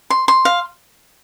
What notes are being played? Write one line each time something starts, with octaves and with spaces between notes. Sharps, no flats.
C6
C6
F5